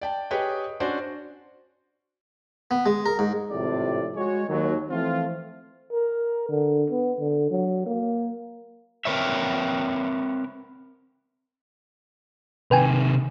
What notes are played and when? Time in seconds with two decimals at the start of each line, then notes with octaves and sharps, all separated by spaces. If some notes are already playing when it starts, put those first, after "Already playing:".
0.01 D5 G5 A5
0.31 G4 G#4 B4 C#5 D#5 G5
0.80 C#4 D4 F#4 C5 D5
2.71 B3
2.86 G#3
3.06 A#4
3.19 G#2
3.50 G#1 A2 C3 F3 D5
4.16 G#3 F#4 C#5
4.49 D#2 F#3
4.90 E3 F3 A3 C4 F4
5.93 A#4
6.49 D3
6.90 B3
7.20 D3
7.50 F#3
7.86 A#3
9.05 C4 A#4 B4 C#5 E5
12.71 C3 D#3 B4 G5 G#5